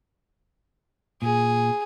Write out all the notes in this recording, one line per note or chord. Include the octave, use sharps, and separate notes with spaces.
A#2 G#4